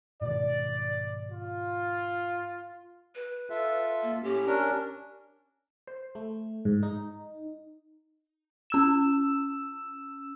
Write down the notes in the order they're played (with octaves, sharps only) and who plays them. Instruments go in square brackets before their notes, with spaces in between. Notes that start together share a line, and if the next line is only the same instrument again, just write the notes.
[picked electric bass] G#2 B2 D#3 [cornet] D5
[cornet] F4
[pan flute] B4
[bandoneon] F4 A4 E5
[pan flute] A#3
[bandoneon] A2 C#4 [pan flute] G4
[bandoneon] C#4 D4 A#4
[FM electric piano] C5
A3
G#2
D#4
[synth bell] C#4 E6 E7